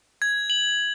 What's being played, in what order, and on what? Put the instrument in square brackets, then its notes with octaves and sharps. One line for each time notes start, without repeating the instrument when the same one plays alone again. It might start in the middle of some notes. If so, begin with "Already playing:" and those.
[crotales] G#6
F#7